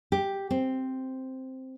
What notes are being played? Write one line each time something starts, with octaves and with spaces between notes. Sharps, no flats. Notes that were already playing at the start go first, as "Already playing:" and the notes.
G4
C4